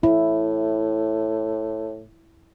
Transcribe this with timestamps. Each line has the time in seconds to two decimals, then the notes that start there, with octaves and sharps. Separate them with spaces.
0.03 A2 E4